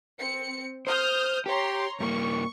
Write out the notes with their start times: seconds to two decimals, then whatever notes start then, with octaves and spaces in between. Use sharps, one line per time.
0.19 C4 C#7
0.87 C5 D#6 F6 G6
1.46 G4 C#5 A#5 C6
2.00 G2 A#3 C#6